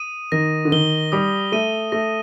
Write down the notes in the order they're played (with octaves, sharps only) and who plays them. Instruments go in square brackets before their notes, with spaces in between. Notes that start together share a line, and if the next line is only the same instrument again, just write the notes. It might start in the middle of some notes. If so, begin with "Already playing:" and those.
Already playing: [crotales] D#6 D#7
[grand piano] D#3 [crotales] A#6
[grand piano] D3
[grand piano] D#3 [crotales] G7
[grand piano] G3 [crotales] D#6
[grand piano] A3 [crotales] D#7
[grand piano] A3 [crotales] A#6